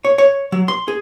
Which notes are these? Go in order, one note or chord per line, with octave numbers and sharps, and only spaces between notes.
C#5
C#5
F#3
C6
G#4